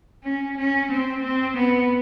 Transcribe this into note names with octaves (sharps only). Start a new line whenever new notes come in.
C#4
C#4
C4
C4
B3